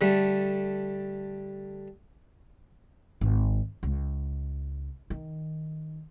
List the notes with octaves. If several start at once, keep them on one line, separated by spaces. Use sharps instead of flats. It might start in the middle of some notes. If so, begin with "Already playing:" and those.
D3 G3 A3
G#1
C#2
D#3